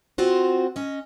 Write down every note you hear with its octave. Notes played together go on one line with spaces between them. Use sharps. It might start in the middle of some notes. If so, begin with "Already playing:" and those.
C4 F4 F#4 C5
C#4 D#5